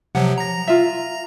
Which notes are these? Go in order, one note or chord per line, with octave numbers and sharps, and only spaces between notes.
C3 F3 F#3 F#5
A#5 A#6
F4 E5